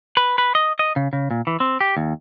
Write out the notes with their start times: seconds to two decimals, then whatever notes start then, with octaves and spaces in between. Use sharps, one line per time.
0.17 B4
0.38 B4
0.55 D#5
0.79 D#5
0.96 C#3
1.13 C#3
1.31 A#2
1.47 E3
1.60 C4
1.81 G4
1.97 D#2